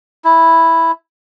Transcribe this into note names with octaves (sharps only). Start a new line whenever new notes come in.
E4